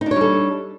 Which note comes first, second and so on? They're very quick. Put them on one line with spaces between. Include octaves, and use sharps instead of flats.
D#4 D4 C#5 G3 A4